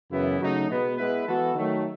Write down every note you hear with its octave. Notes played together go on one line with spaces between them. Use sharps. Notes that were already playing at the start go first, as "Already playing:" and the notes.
F#2 C#3 E3 B3 E4
C#3 F#3 A3 D#4
B2 G#3 B3
G#3 B3 E4 B4
E3 B3 F#4 A4
D#3 F#3 A3